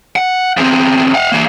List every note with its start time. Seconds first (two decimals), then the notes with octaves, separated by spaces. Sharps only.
0.16 F#5
0.57 E2 C4
1.14 F5 F#5
1.32 E3 A#3